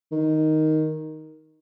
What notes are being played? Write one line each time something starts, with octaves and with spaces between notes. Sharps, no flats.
D#3